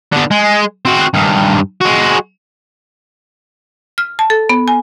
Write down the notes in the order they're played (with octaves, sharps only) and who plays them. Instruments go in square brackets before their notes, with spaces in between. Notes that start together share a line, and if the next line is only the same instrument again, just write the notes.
[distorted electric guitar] D3 B3
G#3
C4 F#4
G2 D#3
G#3 F#4
[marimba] F6
A5
A4
B3
G#5